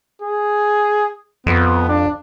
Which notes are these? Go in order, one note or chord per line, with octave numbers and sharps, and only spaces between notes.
G#4
F2 B3
D4